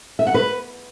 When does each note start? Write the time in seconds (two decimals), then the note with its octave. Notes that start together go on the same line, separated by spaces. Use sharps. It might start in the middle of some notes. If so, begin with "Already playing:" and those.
0.19 E5
0.27 F#5
0.34 B4